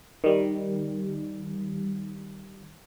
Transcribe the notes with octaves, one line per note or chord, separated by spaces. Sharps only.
D#3 G3